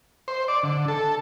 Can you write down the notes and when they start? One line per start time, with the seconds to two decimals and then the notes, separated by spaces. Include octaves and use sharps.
0.28 C5
0.48 D5
0.63 D3
0.88 A4